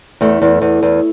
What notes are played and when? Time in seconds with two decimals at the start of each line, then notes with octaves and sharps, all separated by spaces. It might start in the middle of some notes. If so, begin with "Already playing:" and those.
0.21 E2 A3
0.42 E2
0.62 E2
0.83 E2